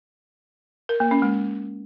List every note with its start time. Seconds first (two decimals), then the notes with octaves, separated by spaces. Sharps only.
0.89 A#4
1.00 A#3
1.11 C#4
1.22 G#3